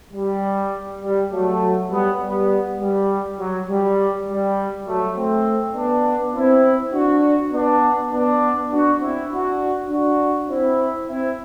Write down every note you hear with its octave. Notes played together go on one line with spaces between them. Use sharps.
G3
G3
F#3 A3
G3 B3
G3 B3
G3
F#3
G3
G3
F#3 A3
A3 C4
B3 D4
C4 E4
D4 F#4
B3 D4
B3 D4
D4 F#4
C4 E4
D4 F#4
D4 F#4
C4 E4
C4 E4